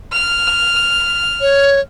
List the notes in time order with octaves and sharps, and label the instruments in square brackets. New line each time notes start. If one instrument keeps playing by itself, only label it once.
[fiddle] F6
[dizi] C#5